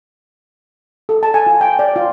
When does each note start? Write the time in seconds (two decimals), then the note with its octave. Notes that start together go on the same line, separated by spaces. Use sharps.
1.09 A4
1.23 A5
1.34 G#5
1.46 F4
1.61 G5
1.79 D5
1.96 F4